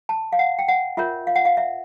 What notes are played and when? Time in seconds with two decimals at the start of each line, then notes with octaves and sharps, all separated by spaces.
0.09 A5
0.33 F5
0.39 F#5
0.59 G5
0.68 F#5
0.97 F4 A#4 C#5 E5
1.27 F5
1.36 F#5
1.45 F5
1.57 E5